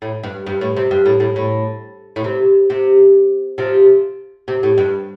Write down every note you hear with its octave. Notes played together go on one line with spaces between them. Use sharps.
A2
G2
G2
A2
C3
G2
A2
A2
A2
A2
C3
C3
C3 F3
C3
A2
G2